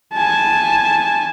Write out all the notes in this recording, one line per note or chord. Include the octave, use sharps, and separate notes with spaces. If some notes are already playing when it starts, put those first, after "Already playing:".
G#5 A5